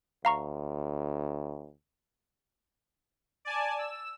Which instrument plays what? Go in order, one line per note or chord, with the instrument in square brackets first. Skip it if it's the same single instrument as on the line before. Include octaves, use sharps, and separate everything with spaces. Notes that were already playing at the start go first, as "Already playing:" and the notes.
[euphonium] D2 [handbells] F5 A#5 C#6
[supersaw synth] D5 G#5 A5
E6